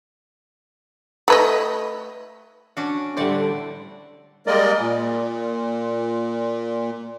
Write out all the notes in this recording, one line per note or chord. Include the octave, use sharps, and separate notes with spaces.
A3 B4 D#5
C#4 D4 F#4
A2 D3 G3 C5 D5 F#5
G3 G#3 A#3 A#4 D5 D#5
A#2